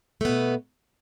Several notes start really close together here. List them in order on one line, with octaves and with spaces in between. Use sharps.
A3 B3 B2